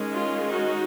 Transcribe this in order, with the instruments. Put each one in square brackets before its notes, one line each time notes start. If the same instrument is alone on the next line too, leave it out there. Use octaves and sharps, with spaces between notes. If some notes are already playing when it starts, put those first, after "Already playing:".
Already playing: [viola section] D#3 G#3 C#4
F4
D#4 F#4